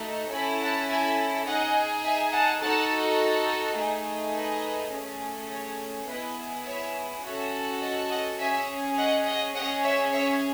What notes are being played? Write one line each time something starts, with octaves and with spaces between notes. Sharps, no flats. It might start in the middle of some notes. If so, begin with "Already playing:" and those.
Already playing: A3 D#4 F#4 A4
C#4 E4 A4 G#5 B5
F#5 A5
E5 G#5
D#4 G#4 D#5 F#5
E5 G#5
F#5 A5
D#4 F#4 A4 F#5 A5
A3 D#4 G#4
B4 D#5
A3 C#4 G#4
C#5
B3 E4 G#4 B4 D#5
C#5 E5
C#4 F#4 A4 C#5 E5
D#5 F#5
D#5 F#5
C#4 G#4 E5 G#5
D#5 F#5
D#5 F#5
C#4 G#4 D#5 F#5
C#5 E5
C#5 E5